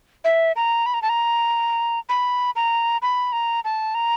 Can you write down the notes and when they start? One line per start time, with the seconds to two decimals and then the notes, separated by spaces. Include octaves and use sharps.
0.24 E5
0.56 A#5
0.86 B5
0.94 A#5
1.02 A5
1.09 A#5
2.09 B5
2.56 A#5
3.02 B5
3.32 A#5
3.64 A5
3.94 A#5